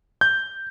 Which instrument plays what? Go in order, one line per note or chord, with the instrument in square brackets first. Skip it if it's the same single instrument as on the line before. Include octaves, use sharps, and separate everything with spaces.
[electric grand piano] G6